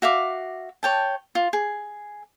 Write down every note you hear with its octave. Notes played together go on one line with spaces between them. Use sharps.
F#4 E5 F5 D6
C#5 G5 A5
F4
G#4